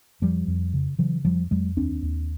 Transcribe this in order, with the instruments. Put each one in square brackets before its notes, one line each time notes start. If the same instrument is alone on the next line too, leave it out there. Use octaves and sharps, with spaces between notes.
[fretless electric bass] F2 F3 G3
F2
C#3
C#3 E3 F#3
F2 F3 G3
F2 F#3 G#3
D#2 C4 D4
D#2